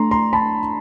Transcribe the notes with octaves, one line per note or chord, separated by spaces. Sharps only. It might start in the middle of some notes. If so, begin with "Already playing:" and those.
Already playing: A3 D4 A#5 C6
A#5 C6
A5 B5